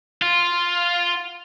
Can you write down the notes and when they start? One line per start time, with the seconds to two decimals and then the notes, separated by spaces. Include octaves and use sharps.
0.22 F4